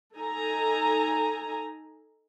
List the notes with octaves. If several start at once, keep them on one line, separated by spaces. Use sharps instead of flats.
D#4 A4 G#5 A#5